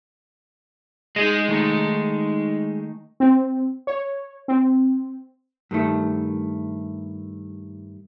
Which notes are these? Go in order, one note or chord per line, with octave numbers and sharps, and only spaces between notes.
G#3 D#4 G#4 D#5
D#3 A3 D#4
C4
C#5
C4
G2 D#3 A3